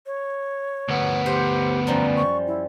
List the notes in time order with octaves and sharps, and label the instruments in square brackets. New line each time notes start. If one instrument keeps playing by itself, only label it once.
[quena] C#5
[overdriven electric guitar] D2 B3
[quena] G4 [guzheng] C5
[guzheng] F#2 F3 G3 [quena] A#5
[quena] C#6
E4